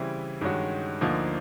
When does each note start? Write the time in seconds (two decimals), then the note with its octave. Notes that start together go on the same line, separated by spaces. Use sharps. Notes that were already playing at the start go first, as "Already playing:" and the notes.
Already playing: C#3 E3 G3 C4 E4
0.41 G2 D#3 G#3 C#4 F#4
1.01 D2 D3 F3 A#3 D#4